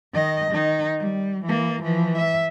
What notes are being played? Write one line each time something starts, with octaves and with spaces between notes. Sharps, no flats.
D#3 D#5
D#3 D#4
G3
E3 A#3
E3 F3
E5